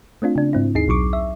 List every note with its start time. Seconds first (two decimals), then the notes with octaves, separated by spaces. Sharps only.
0.22 A3 C4 D4 F4
0.36 C#3 D4
0.53 G#2 C4 E4
0.75 D#2 D#4 G#4 C7
0.88 B1 F#3 C#6 D6
1.13 E5